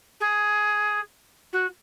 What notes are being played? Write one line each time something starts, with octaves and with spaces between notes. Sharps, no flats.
G#4
F#4